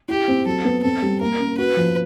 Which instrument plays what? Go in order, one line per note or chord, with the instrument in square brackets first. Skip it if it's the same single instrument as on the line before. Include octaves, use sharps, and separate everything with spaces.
[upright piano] E4 [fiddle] G4
[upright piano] C4
[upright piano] F#3 [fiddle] A4
[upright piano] B3
[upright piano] C4 [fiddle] A4
[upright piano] G3
[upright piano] A#3 [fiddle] A#4
[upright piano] C#4
[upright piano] F#4 [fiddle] B4
[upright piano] F3